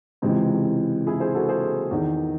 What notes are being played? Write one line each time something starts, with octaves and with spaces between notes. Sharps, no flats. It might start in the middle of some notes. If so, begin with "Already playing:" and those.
C#2 C3 E3 G#3 C4
E4 G#4
G#4 C5
F#4 A4
G#4 C5
E2 D#3